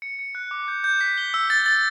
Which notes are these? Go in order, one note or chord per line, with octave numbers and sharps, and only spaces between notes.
C#7
C#7
F#6
D6
G6
G6
B6
G7
E6
A6
A6